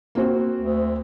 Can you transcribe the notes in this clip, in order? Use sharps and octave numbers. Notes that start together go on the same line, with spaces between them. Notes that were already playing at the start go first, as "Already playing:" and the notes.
A#3 C4 F#4
D2